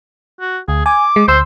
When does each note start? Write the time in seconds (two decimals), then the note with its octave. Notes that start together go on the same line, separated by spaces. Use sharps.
0.41 F#4
0.68 D2 G#4
0.86 G#5 D6
1.16 G#3
1.28 D2 C5 C6 E6